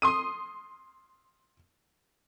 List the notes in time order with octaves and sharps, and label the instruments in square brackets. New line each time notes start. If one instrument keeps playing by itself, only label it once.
[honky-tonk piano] C6 D#6 D#7